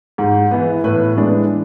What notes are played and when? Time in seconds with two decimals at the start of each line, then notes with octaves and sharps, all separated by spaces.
0.18 G#2
0.51 E3 B3
0.84 A2 B4
1.17 E3 G#3 B3 D4